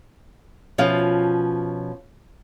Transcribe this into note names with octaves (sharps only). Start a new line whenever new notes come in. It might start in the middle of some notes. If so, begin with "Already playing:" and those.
B2 F3 C#4 F4 F5